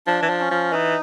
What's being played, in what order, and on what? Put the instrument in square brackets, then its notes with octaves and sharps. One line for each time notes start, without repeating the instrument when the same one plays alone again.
[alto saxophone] F3 [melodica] D4
[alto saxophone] E3
F3
[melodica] C#4
[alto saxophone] F3
[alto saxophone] E3 [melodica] D#4